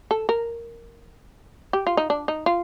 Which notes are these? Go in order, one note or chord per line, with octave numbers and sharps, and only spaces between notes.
A4
A#4
G4
F4
D#4
D4
D#4
F4